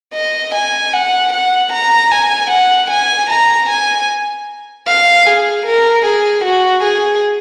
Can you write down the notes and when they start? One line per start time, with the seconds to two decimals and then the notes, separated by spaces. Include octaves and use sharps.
0.14 D#5
0.54 G#5
0.93 F#5
1.33 F#5
1.73 A#5
2.12 G#5
2.51 F#5
2.91 G#5
3.30 A#5
3.69 G#5
4.88 F5
5.26 G#4
5.66 A#4
6.05 G#4
6.44 F#4
6.84 G#4